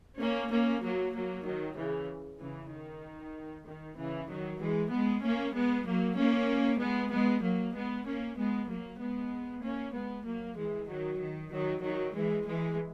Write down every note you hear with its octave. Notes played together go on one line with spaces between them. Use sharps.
A#3 C#4
A#3 C#4
F#3 A#3
F#3 A#3
D#3 F#3
C#3 E3
C#3 E3
D#3
D#3
C#3 E3
D#3 F#3
E3 G#3
G#3 B3
A#3 C#4
G#3 B3
F#3 A#3
A#3 C#4
G#3 B3
G#3 B3
F#3 A#3
G#3 B3
A#3 C#4
G#3 B3
F#3 A#3
G#3 B3
A#3 C#4
G#3 B3
F#3 A#3
E3 G#3
D#3 F#3
D#3
D#3 F#3
D#3 F#3
E3 G#3
E3 G#3